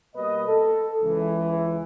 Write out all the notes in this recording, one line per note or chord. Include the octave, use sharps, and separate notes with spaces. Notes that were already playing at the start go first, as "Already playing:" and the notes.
B2 G3 A#3 B4 D#5
A4
C#2 E3